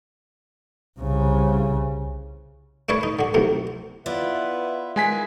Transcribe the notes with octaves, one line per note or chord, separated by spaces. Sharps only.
C2 C#3
A3 D4 A4 B4 C#5
D#4
D3 F#4
B1 F2 A2 C3
B3 E4 F4 B4 D5 E5
D#3 G#3 B3 B4 G#5 B6